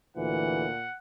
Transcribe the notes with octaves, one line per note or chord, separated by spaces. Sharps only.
D2 A#2 E3 F#5